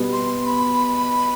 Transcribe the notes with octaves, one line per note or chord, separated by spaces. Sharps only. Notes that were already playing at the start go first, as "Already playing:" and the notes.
Already playing: B2 G3 B3
C6
B5